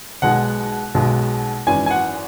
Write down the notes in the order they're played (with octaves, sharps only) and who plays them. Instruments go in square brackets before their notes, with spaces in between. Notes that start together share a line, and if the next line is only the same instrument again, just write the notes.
[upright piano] B1 B2 G#3 F#5
B1 B2 G#3
G#1 F#2 E3 G#5
G#5
F#5